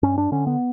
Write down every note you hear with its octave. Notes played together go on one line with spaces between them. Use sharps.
G2 C#4
D4
D3 C#4
B3